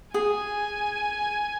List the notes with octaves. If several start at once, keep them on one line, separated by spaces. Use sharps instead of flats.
G#4 G#5